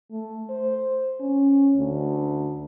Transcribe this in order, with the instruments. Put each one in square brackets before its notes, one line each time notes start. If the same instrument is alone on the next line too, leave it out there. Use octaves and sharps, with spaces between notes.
[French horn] A3
C5
C#4
D2